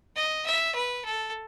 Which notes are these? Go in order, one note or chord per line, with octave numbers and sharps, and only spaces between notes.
D#5
E5
B4
A4